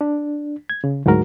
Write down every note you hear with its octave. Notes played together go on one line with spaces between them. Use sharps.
D4
G#6
C#3
D2 G#2 F#3 F#4 A#4